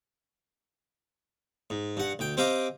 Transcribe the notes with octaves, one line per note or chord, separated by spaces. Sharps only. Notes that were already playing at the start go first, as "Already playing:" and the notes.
G#2
G2 F#5
D2 G5
C4 G4 D#5 F5 A#5 D6